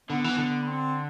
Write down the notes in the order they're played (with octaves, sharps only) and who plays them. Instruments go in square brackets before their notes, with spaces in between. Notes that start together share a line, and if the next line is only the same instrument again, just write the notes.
[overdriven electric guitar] D3 [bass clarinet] B3
[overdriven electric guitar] E3 [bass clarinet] B3
[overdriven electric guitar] D3
[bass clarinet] B3
C4